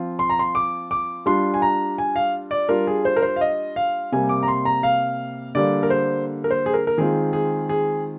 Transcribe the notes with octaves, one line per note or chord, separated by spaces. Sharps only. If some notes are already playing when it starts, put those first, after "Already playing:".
Already playing: F3 C4 F4
C6
A#5
C6
D6
D6
G3 D4 F4 C6
G#5
A#5
G#5
F5
D5
G3 D4 F4 A#4
G#4
C5
A#4
C5
F5
D#5
F5
C3 G3 A#3 G#5
D6
A#5
C6
A#5
F5
D3 G3 A#3 D5
A#4
C5
A#4
C5
G#4
A#4
A#4
D#3 G#3 C4 F4 G#4
G#4
G#4